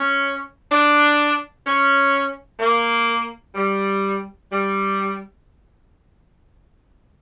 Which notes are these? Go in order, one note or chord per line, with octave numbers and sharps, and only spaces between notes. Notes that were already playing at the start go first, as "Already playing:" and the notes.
Already playing: C#4
D4
C#4
A#3
G3
G3